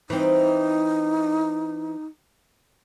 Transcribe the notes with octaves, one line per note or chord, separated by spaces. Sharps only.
E3 C4 D#4